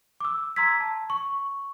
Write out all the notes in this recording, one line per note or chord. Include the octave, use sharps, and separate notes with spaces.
D6 E6
A#5 C6 E6 G#6 B6
A5
C#6